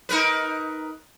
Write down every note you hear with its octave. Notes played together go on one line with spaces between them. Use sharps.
D#4 A#4 B4